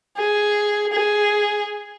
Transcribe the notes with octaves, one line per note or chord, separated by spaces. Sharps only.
G#4
G#4